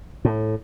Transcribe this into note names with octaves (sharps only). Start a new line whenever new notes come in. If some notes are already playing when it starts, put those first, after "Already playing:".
A2